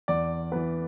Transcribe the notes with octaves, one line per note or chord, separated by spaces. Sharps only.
E2 D5
E3 B3 B4